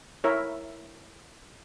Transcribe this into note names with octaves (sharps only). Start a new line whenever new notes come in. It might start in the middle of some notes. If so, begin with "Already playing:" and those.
E4 A#4 C#5 E5